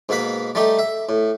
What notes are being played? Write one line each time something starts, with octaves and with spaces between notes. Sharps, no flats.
G#2 B2 A#3 B4 B5
G3 A3 D#4 G4
E5
A2